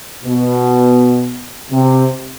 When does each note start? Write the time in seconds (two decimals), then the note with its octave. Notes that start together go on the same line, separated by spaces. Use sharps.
0.24 B2
1.71 C3